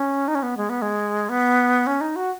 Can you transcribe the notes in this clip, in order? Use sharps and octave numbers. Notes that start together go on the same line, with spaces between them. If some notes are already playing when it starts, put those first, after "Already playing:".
Already playing: C#4
D#4
C#4
B3
G#3
B3
G#3
B3
C#4
D#4
F#4